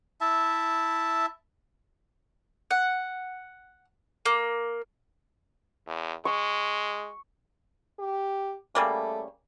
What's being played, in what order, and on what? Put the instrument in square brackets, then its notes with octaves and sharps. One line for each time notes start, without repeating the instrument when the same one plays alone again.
[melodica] E4 E5 A5
[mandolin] F#5
A#3
[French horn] E2
[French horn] G#3 [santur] C#6
[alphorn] G4
[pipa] C#3 G3 A#3 [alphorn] A3